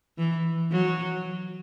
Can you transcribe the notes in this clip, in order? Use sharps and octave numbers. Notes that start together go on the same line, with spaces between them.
E3
F#3